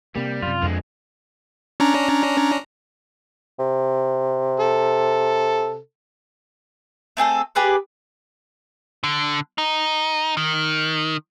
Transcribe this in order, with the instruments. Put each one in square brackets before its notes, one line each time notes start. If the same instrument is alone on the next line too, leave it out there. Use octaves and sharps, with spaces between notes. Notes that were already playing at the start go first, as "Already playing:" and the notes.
[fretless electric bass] C3 A#3 [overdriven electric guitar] G3
[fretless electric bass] F#2 C3 [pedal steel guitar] F4
[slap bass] F2 [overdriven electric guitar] D3 G#3
[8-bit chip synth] C#4 D4 A#5
[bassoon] C3
[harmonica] A4
[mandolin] A3 C4 G#4 A4
G4 G#4 B4 D5
[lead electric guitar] D3
D#4
D#3